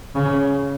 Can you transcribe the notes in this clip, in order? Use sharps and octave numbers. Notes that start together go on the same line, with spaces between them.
C#3